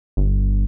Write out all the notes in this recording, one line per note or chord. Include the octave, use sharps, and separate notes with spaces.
G1